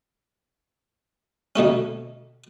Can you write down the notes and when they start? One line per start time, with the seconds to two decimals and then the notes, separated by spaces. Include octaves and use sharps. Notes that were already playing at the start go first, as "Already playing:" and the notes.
1.56 D2 B2 A3 C#4